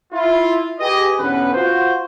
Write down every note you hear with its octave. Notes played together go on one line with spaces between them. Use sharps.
E4 F4
G4 G#4 B4 D#5
B1 E2 D3 B3 C#4 B4
F4 F#4 C5